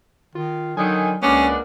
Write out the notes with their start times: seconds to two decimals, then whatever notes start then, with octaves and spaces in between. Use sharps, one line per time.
0.35 D#3 F4
0.77 D3 D#3 F#3 G#5
1.22 C#2 G#3 A#3 B3 C#4 D4